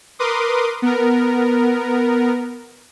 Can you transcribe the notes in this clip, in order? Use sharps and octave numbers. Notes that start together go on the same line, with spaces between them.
A#4 B4 C6 D6 D#6
B3 A#4